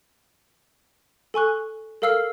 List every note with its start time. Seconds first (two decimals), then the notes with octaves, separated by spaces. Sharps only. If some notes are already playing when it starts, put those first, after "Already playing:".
1.34 A4 G#5 C#6 F#6
2.02 A4 A#4 F5 E6 F6 C7